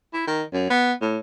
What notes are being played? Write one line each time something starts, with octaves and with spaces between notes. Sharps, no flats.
E4
D#3
F#2
B3
A2